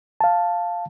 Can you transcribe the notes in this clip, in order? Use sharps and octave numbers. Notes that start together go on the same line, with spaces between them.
F5 A5